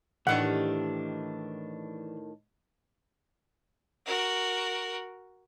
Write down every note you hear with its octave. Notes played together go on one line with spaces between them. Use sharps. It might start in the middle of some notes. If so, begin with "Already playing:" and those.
A2 D#3 E3 D4 G4 F#5
F#4 A#4